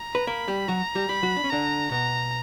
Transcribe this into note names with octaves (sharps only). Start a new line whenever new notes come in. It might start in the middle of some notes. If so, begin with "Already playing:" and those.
Already playing: A#5
B4
A#3 A#4 B5
G3 G4
F#3 F#4 A#5
G3 G4
G3 G4 B5
F#3 F#4
D4
C#4
D3 D4 A#5
B2 B3 A#5